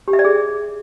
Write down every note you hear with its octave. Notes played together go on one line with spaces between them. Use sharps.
G4
E5
D5
G#4